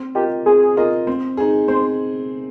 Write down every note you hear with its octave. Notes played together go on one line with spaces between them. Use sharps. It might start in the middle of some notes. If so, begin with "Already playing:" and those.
Already playing: C4
F4 G4 A#4 D#5
C4 G#4
F4 A#4 D#5
C4
D#4 G#4
C4 C5